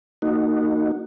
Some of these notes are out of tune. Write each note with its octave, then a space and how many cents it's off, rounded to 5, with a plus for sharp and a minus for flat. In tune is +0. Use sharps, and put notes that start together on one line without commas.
A#3 -30 D#4 -15 F#4 +0